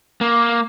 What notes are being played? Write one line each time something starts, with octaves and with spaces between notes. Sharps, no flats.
A#3